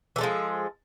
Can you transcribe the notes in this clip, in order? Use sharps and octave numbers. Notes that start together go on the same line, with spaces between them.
E3 F3 G#3 A4